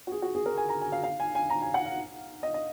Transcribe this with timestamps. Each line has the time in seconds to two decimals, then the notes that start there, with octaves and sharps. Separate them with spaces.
0.07 F#4
0.12 G#4
0.22 F#4
0.35 G#4
0.46 A#4
0.58 G#5
0.69 A#5
0.81 G#5
0.92 F5
1.03 F5
1.20 G#5
1.35 G#5
1.50 A#5
1.62 G#5
1.74 F#5
1.85 F5
2.43 D#5
2.54 D#5